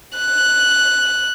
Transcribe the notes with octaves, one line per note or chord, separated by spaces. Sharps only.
F#6